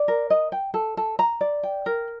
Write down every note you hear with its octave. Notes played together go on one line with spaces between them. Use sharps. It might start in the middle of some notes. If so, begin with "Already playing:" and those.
Already playing: D5
A#4
D#5
G5
A4
A4
A#5
D5
G5
A#4